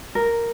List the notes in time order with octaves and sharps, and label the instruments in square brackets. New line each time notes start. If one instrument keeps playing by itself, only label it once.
[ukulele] A#4